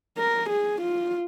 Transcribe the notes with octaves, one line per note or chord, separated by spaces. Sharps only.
A#4
G#4
F4